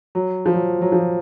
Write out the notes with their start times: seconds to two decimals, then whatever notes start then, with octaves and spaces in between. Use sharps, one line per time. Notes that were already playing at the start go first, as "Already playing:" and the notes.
0.15 F#3
0.46 F3
0.53 F#3
0.82 F#3
0.92 F3